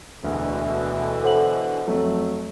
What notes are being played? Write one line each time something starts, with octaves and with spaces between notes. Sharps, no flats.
E1 D2 B2 D3 E3
A4 C5 F#5 F#7
F2 F#3 A3